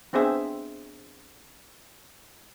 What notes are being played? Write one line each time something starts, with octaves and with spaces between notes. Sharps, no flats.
B3 C4 D4 G#4 E5